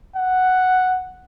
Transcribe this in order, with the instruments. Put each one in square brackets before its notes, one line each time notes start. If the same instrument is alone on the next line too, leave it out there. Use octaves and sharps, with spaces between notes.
[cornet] F#5